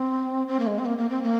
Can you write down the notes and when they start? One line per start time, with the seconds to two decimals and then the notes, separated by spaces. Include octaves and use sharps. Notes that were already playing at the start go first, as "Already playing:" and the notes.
Already playing: C4
0.48 C4
0.60 A#3
0.67 G#3
0.79 C4
0.85 A#3
0.98 A#3
1.10 C4
1.23 A#3